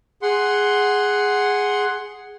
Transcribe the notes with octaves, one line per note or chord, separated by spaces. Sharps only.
G#4 F#5 C6